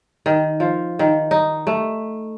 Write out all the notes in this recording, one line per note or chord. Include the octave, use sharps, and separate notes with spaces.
D#3
F3
D#3
D#4
A3